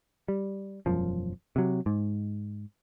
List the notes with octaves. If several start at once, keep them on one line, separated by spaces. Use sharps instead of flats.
G3
E1 F#2 F3
C3 F#3
G#2